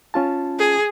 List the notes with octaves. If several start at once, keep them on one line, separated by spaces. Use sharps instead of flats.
C#4 F4 A5
G#4